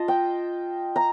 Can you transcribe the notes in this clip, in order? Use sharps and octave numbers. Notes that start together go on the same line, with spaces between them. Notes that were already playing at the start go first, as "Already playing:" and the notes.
Already playing: F4 D#5 A5
G5
A#5